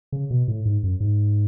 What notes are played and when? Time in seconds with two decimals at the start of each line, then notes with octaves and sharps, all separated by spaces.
0.12 C#3
0.31 B2
0.48 A2
0.65 G#2
0.83 F#2
1.00 G#2